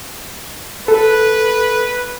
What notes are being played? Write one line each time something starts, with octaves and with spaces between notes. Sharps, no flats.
A4 B4